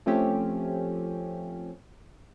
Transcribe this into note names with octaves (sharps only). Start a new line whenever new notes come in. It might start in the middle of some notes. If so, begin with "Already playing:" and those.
F3 A3 C4 C#4 G4